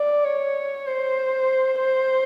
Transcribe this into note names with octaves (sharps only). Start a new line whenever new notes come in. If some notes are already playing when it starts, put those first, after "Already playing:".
Already playing: D5
C#5
C5
C5